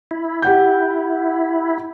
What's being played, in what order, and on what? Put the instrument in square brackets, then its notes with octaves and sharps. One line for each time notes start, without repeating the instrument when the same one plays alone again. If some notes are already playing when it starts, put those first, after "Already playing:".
[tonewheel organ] E4
[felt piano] G4 F#5 G6